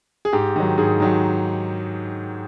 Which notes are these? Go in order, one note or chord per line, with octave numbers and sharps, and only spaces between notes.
G#4
G#2 G4
D#3 F#3
G#2 G#4
D#3 F#3